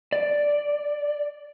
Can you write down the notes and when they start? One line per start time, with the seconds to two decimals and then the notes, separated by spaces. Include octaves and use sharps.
0.12 D5